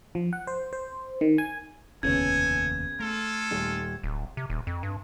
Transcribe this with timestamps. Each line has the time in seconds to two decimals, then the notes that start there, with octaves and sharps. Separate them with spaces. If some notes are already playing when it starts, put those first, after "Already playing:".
0.15 F3
0.33 F#5
0.47 C5
0.73 C5
1.21 D#3
1.38 G#5
2.03 F1 D#2 C#3 B3 C#4 A4 G#5 G#6
3.00 A3 F4 A4
3.51 D#1
4.04 D1
4.37 C3
4.50 D#1
4.67 F2
4.83 G2